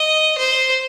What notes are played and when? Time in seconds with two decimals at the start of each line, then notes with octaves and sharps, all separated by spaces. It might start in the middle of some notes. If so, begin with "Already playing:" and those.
Already playing: D#5
0.38 C5